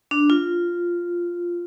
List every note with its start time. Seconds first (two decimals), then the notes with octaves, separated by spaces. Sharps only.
0.11 D4
0.30 F4